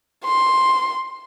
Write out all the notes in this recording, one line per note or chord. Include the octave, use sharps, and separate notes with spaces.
C6